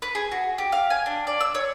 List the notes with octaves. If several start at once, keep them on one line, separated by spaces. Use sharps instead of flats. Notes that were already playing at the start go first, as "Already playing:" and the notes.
B4
G#4
F#4
G4
F5
G#5
D4
D5
E6
C#5